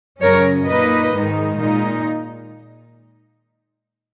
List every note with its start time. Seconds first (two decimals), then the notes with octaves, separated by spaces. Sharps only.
0.21 F#2 C#3 F#3 C#4 A#4 C#5
0.67 A#2 A#3 D#4 B4 D#5
1.12 G#2 D#3 G#3 D#4
1.58 A#2 G#3 D#4